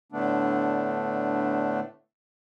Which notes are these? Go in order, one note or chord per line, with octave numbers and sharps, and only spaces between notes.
A2 D3 A3 B3 D4